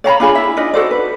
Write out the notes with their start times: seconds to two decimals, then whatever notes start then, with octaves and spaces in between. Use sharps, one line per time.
0.04 C#5 F5 A#5 B5
0.20 D4 F4 G#4 B5
0.35 E4 E5
0.57 D4 D#4 F4 D#5
0.74 F#4 A4 C5 D5
0.91 B4